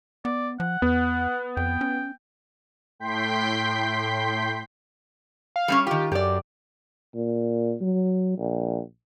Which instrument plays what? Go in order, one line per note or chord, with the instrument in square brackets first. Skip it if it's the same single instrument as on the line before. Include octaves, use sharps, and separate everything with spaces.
[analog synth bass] B3 [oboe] D5
[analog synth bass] F3 [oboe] F#5
[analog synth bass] E2 [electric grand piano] B3
[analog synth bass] F2 [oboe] G5
[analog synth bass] C#4
[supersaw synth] A2 G5 C6 G6 B6
[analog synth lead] F5
[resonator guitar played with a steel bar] G3 C4 C#4
[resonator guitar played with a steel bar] D#3 F4 [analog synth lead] G4
[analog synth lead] F#2 [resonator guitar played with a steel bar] G4 D5
[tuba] A#2
F#3
A#1